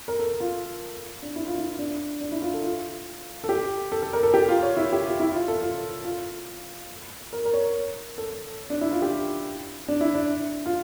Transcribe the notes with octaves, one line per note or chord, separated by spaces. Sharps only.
A#4
A4
F4
D4
E4
F4
E4
D4
D4
E4
F4
A4
F4
A4
G4
A4
A4
A#4
A4
G4
F4
C#5
E4
G4
F4
E4
F4
A4
F4
F4
A#4
A#4
C#5
A4
D4
E4
F4
G4
D4
E4
D4
F4